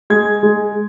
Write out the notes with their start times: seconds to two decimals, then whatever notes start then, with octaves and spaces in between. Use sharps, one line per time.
0.10 G#3 G#6
0.43 G#3